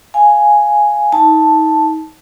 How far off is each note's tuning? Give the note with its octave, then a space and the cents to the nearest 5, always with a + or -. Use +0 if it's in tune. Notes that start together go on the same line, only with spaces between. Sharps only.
F5 +0 G#5 +0
D#4 +30 A5 +0